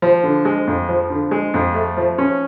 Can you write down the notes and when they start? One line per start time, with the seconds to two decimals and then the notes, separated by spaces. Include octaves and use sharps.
0.02 F3
0.24 D3
0.45 G#3
0.67 F2
0.89 F3
1.10 D3
1.31 G#3
1.54 F2
1.75 A3
1.97 F3
2.18 C#4